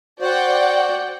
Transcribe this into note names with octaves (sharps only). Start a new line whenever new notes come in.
F#4 C5 D5 F#5 G5